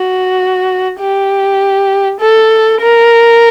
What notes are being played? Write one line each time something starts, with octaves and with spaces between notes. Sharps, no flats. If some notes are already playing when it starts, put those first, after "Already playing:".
Already playing: F#4
G4
A4
A#4